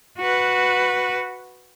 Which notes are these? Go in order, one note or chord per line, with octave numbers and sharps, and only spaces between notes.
F#4 B4